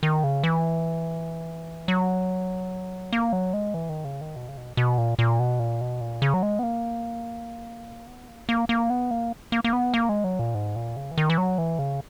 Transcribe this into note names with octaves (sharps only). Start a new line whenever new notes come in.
D#3
C#3
E3
F#3
A#3
F#3
G#3
E3
D#3
C#3
D#3
B2
C#3
B2
B2
A#2
A#2
B2
A#2
B2
A#2
C#3
F#3
G#3
B3
A#3
B3
A#3
A#3
A#3
B3
A#3
A#3
A#3
B3
A#3
G#3
F#3
A#2
G#2
A#2
C#3
E3
D#3
E3
F#3
E3
C#3